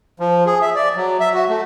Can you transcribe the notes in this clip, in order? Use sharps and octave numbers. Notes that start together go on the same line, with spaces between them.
F3
G#4
E5
D5
F#3
E5
F#4
A3